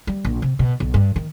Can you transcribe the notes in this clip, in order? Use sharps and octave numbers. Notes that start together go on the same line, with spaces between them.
G3
A#1
C3
B2
B1
G2
D#3